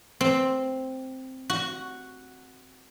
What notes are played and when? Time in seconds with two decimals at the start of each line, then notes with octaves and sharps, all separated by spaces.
0.21 C4
1.50 F#4